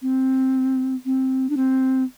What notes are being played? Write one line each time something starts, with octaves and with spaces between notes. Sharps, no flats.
C4
C4
D4
C4